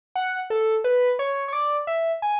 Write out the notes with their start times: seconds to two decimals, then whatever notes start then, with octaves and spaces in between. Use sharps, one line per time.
0.16 F#5
0.50 A4
0.84 B4
1.19 C#5
1.48 C#5
1.53 D5
1.87 E5
2.22 G#5